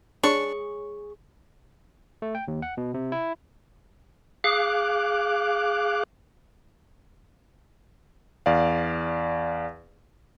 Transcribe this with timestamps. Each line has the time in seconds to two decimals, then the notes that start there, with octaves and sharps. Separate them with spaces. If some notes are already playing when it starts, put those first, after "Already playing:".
0.23 D4 G#4 C#5 C#6
2.22 A3
2.35 G5
2.48 D#2
2.62 F#5
2.77 B2
2.94 C3
3.12 E4
4.44 G#4 F5 D6 F#6
8.46 E2 D5 F5